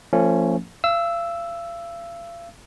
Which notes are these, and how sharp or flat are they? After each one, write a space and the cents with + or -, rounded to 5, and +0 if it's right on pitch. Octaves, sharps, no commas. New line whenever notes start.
F3 +0 A3 +45 C#4 +0
F5 -40 E6 +0